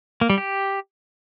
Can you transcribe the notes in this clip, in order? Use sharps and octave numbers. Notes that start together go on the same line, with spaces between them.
A#3
G3
G4